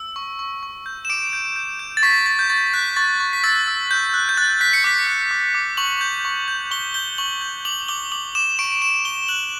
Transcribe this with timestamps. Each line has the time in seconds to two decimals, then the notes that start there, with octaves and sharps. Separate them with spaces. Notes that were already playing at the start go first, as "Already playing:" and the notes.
Already playing: E6
0.16 C#6
0.39 C#6
0.63 C#6
0.86 G6
1.05 E7
1.09 D6 D7
1.33 G6
1.56 G6
1.79 G6
1.97 A6
2.03 C#6 B6
2.26 C#6 A6
2.39 G6
2.50 C#6 A6
2.73 F#6 B6
2.96 C#6 A6
3.20 C#6
3.33 B6
3.44 E6 A6
3.67 E6
3.91 F#6 G6
4.14 F#6
4.29 G6
4.37 F#6 A6
4.61 F#6 B6
4.73 C#7
4.84 D6 B6
5.07 F#6
5.31 D6
5.55 D6
5.77 C#6 F#7
6.01 G6
6.25 C#6
6.48 G6
6.71 C#6 G7
6.94 G6 G7
7.18 C#6 F#7
7.41 G6
7.65 D6 F#7
7.88 D6 G7
8.12 D6 F#7
8.35 D6 E7
8.59 C#6 D7
8.82 C#6 E7
9.05 C#6 G7
9.28 F#6 F#7